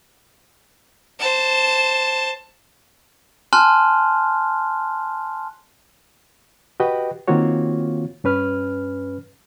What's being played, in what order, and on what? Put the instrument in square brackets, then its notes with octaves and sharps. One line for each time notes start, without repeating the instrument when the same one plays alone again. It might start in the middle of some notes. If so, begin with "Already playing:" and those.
[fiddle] C5 A5
[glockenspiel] G#5 A5 C6 F6 F#6
[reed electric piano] F#4 G4 B4 D#5 G5
D#3 A#3 C4 F4 F#4 C#5
G2 C#4 B4 F6